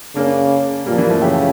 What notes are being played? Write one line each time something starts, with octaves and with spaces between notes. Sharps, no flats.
C#3 A#3 D4
A#2 G3 A#3
F3
E3 G3
F3 A3
C#3 E4 G4